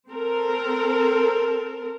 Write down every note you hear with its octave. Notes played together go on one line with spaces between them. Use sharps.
C4 A4 A#4